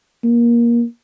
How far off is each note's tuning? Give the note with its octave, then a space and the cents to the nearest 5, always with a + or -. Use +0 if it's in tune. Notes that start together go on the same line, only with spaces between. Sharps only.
A#3 +20